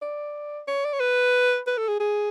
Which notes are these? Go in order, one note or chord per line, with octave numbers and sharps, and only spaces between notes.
D5
C#5
D5
C#5
B4
B4
A4
G#4
G#4